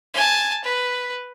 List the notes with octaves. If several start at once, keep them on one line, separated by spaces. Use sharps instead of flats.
G#5 A5
B4